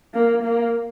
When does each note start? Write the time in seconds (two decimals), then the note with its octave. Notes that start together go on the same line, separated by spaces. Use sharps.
0.14 A#3
0.43 A#3